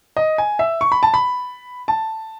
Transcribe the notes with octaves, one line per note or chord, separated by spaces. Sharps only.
D#5
G#5
E5
C#6
B5
A5
B5
A5